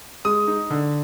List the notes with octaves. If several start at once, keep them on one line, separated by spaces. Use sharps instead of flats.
G#3 D#6
D#4
D3